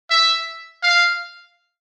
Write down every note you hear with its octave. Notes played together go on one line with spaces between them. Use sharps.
E5
F5